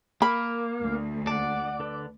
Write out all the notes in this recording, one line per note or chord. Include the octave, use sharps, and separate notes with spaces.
A#3 A#4 B5
D2
D5 F#5 A5
D3 A4 B4